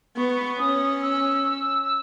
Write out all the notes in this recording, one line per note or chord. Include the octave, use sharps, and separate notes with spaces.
B3 C#6
C#4 D#6
E6